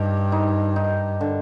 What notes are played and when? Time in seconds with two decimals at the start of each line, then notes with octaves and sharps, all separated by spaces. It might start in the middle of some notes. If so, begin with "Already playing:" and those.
Already playing: G2 D#4 G4
0.32 D#4
0.76 D#4
1.21 D3